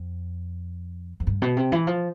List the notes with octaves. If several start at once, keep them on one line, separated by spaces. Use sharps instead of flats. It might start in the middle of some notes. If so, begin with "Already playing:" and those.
Already playing: F2
F2
G2
B2
C3
E3
F3